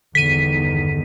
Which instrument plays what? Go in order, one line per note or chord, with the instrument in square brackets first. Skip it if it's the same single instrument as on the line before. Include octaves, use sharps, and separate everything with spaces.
[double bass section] G1 E2 D#3 [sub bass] D3 [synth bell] B6 D#7